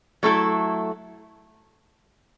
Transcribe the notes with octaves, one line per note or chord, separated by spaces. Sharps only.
F#3 A3 E4 A4